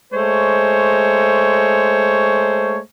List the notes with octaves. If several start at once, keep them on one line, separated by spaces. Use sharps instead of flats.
G#3 A3 C5 C#5